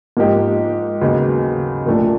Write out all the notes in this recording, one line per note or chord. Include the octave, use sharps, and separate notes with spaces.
G#2 F3 A#3 D#4 G4
D#2 C#3 F#3 B3 D#4
C2 A#2 F3 A3 D4